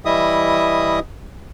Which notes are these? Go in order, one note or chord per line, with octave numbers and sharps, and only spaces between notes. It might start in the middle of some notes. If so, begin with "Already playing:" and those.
E3 G3 E4 D#5 E5 D#6